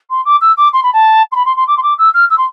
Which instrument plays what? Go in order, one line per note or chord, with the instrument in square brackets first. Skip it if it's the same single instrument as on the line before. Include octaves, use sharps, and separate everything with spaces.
[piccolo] C6
D6
E6
D6
C6
B5
A5
C6
B5
C6
C6
D6
C6
D6
E6
F6
E6
C6